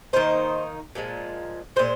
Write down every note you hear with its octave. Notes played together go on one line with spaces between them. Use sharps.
D#3 A#3 D#4 C5
A#2 F3 G#3
A#2 F3 G#3 C5